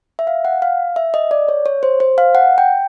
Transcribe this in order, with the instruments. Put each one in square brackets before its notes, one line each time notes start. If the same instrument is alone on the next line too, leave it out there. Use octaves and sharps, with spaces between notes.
[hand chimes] E5
F5
F#5
F5
E5
D#5
D5
C#5
C#5
C5
C5
F5
F#5
G5